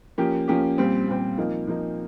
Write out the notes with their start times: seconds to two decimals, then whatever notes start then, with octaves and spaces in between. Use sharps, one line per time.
0.18 F3 A#3 C#4 G4
0.48 F3 A#3 C#4 G4
0.78 A#2 G3 C4
1.08 A#2 G3 C4
1.38 F3 A#3 D#4
1.67 F3 A#3 D#4